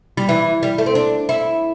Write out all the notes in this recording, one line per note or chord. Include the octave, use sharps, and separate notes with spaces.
G3
E3
G3
A3
C4
D4
E4